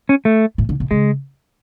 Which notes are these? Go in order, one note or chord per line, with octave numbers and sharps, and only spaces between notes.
C#4
A3
A2
D3
B2
C#3 G#3